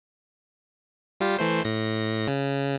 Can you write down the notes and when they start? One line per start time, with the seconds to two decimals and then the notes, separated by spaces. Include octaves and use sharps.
1.21 G3 F4 G4
1.39 E3 A3 C5
1.65 A2 A#6
2.28 C#3